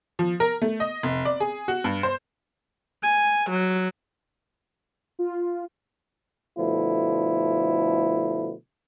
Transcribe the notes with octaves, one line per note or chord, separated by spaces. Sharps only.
F3
A#4
A3
D#5
F1
D5
G#4
F#4
G2
C5
G#5
F#3
F4
B2 D3 F3 A3 E4